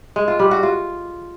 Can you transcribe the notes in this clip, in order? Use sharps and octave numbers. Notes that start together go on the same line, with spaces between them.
G#3
F4
G3
F#4
F4